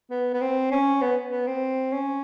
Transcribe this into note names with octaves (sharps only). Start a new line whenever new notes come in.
B3
B3
C4
C#4
B3
B3
C4
C#4